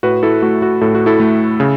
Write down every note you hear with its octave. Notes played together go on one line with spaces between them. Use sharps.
A2 F#4 B4
E4 A4
A3 F#4
F#4
A2 A4
F#4
E4 A4
A3
C#3